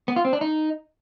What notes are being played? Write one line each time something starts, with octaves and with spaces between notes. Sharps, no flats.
B3
F4
C4
D4
D#4